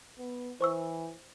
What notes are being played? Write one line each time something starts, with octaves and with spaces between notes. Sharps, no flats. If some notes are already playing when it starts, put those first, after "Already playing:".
B3
E3 C5 C#6 E6